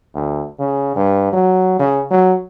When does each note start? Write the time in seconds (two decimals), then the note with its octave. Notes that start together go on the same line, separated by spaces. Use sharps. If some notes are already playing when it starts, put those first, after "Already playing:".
0.14 D2
0.59 C#3
0.96 G2
1.33 F#3
1.79 C#3
2.11 F#3